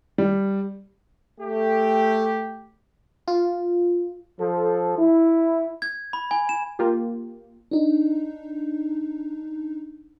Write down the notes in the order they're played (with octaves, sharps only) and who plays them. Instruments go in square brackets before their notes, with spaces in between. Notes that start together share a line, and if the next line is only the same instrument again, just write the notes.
[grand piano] G3
[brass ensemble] A3 G4
[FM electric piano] F4
[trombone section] F3 A4
E4
[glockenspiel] G#6
B5
G#5
E7
[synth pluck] A#3 F4 G4
[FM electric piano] D4 D#4